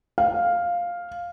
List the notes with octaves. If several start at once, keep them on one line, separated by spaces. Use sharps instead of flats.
F5